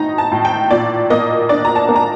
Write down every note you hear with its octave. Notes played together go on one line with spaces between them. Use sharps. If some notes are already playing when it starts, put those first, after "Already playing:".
Already playing: A2 D#4 A#5
A5
A2
G5
A#2 D5
A#3 D#5
D4 D5
A#5
A5
A#3
A#5